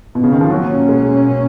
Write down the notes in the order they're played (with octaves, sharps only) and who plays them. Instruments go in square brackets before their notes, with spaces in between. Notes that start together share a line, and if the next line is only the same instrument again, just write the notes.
[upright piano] B2
C#3
D#3
F3
[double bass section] B2 A#3 C#4 [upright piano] F#3
[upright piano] G#3